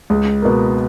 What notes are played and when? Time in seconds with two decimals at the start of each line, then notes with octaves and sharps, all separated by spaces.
0.10 C#2
0.42 B2 A#3